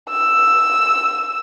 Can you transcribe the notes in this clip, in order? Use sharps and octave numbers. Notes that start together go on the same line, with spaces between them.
E6